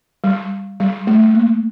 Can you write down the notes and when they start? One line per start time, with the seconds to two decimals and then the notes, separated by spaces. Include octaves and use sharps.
0.24 G3
0.80 G3
1.07 A3
1.34 A#3